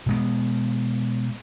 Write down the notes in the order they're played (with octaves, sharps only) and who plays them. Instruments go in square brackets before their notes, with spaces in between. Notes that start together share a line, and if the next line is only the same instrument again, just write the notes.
[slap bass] B2 G#3 B3